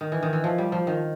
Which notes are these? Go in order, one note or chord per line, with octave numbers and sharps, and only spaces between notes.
D#3
E3
D#3
E3
F3
G3
F3
D#3